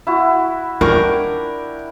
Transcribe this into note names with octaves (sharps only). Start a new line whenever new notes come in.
E4 F#4
D4 F4 A#4 G5 C#6